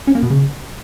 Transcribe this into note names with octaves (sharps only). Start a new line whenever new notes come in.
C#4
A#3
B2
C#3